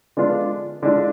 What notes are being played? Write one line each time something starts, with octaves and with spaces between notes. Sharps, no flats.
D3 G#3 B3 D4 F4
D3 G#3 D4 F4